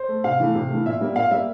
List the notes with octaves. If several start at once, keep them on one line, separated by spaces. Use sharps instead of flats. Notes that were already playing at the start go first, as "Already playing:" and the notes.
Already playing: C5
A3
C3 F5
E3 A3
C3
E3 A3
A#2 E5
G3 A#3
A#2 F5
G3 A#3 E5